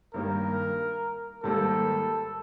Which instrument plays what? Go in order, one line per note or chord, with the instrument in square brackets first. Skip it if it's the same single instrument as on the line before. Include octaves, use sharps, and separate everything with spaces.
[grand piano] G2 D#3 G3 A#3 [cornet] A#4
[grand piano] G#2 D#3 G3 A#3 [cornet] A4